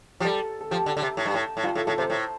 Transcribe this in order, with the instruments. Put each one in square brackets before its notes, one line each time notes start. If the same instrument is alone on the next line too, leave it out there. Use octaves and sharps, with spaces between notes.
[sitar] F3 [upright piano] G4
[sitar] G3 [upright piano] A4
[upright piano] A4
[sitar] F3 [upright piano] G4
[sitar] D3
D3
C3
A2
G2
A2
A2
[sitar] G2 [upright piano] F4
[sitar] A2 [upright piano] A4
[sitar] A2 [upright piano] A4
[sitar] C3 [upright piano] C5
[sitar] A2